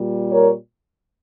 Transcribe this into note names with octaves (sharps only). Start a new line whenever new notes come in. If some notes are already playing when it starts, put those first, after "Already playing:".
Already playing: A#2 G3
A#4 C#5